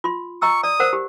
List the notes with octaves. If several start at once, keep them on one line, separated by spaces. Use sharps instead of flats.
F4 C6
D#5 A#5 C#6 E6
D5 D#6
A#4 C5 F#5
G4